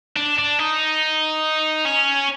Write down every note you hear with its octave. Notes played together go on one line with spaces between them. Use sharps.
D4
D4
D#4
C#4